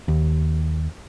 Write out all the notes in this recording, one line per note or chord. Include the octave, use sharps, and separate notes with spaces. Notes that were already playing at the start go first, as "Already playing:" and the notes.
D#2